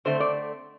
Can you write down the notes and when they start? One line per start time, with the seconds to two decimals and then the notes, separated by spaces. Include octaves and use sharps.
0.05 D3 A3 C4 C5
0.20 D5